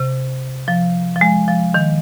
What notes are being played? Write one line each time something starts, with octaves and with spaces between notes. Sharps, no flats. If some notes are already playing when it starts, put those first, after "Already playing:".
Already playing: C3
F3
F3
G#3
F3
D#3